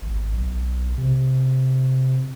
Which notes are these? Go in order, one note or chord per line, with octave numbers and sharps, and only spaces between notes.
G#1
B1
C3